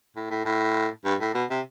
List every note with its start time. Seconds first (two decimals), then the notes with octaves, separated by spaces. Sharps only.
0.16 A2
0.31 A2
0.45 A2
1.05 G2
1.20 A2
1.34 B2
1.50 C3